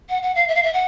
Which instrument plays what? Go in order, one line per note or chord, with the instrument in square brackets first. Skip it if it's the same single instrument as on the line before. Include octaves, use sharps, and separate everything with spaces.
[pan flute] F#5
F#5
F5
E5
F5
E5
F#5